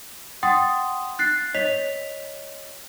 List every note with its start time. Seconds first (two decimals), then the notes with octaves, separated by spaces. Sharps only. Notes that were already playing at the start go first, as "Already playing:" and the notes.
0.43 F#5 G5 C6 D#6 A6
1.19 F#6 A6 C7
1.54 C#5 D#5 B6 F7